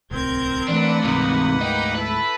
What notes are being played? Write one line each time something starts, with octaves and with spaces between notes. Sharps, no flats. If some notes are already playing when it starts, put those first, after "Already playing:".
D1 C2 C4 A#4 G6 G#6
E3 A3 A#3 D4 B4 F#5
D2 G#2 C3 E3 D#4
D#4 G5
E4 A4 B4